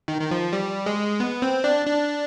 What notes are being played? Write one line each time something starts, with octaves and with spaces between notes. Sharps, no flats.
D#3
D#3
F3
G3
G#3
B3
C4
D4
D4